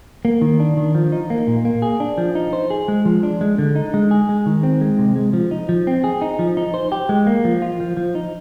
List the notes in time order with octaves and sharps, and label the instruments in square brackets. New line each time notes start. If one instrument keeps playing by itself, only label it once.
[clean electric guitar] A#3
D#3
D4
D#3
F3
D#4
A#3
A#2
A#3
G#4
D4
F3
D#4
C5
G#4
G#3
F3
D4
G#3
D3
D#4
G#3
G#4
G#3
D#3
C4
G#3
C3
G#3
F3
D#4
F3
C4
G#4
D#4
F3
D#4
C5
G4
G#3
A#3
F3
F4
F3
F3
D#4